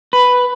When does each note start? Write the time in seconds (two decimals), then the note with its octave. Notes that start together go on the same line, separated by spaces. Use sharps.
0.13 B4